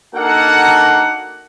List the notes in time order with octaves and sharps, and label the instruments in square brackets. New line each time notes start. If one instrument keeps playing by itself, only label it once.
[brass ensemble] A#3 D4 D#4 F#4 A4 F#5